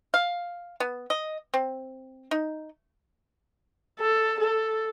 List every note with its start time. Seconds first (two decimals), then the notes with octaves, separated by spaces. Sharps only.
0.14 F5
0.80 B3
1.10 D#5
1.54 C4
2.31 D#4
3.99 A4
4.40 A4